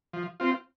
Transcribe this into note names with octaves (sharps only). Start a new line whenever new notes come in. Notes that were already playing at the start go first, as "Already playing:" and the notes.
F3
C4 F4